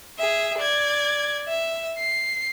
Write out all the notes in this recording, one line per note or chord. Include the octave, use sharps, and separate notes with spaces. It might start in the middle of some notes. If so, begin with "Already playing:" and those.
G#4 E5
D5 G#6
E5
C7